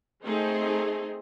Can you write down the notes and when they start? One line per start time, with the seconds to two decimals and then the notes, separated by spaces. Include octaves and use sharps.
0.23 A3 C4 D#4 G#4